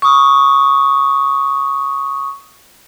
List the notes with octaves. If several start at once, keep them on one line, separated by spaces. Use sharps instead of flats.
C#6 D#6